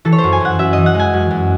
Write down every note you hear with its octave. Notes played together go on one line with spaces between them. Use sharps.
E3 A4
C#5
C5
F#2
G#5
F#2 F#5
F#2 E5
E3 D#5
F#5
G#3 G#5
F#2
F#2